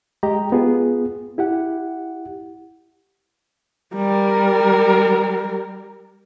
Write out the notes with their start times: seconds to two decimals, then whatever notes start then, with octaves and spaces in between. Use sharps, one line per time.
0.23 G#3 G4 D#5 G5 A#5
0.52 B3 F4 G#4
1.38 E4 G4 F#5
3.95 G3 A#4